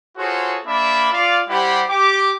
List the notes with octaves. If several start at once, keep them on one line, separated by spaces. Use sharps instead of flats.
F4 F#4 G#4 A4 C5 C#5
A#3 D4 D5 E5 B5
F4 D5 F5
G3 E4 G4 C5 F#5 B5
G4 D6